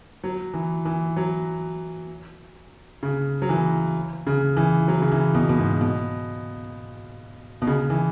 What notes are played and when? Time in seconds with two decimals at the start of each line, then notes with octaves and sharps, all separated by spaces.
0.24 F#3
0.54 E3
0.85 E3
1.16 F#3
3.03 C#3
3.42 F#3
3.49 E3
4.27 C#3
4.57 E3
4.88 F#3
5.02 C#3
5.11 E3
5.35 B2
5.49 B2
5.58 G#2
5.81 B2
7.62 B2
7.67 C#3
7.90 E3